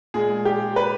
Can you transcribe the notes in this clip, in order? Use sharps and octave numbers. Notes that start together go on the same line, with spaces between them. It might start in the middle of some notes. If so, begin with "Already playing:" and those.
A#2 G#3 G#4
G4
B4